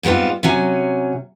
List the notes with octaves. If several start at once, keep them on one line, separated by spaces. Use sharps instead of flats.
G#2 G3 B3 C4 F4
C3 F#3 C#4 G#5